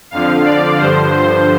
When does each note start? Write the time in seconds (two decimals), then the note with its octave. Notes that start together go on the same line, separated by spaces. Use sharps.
0.11 F2 D3 F3 F5
0.45 D5
0.78 G2 D3 F3 C5
1.12 C5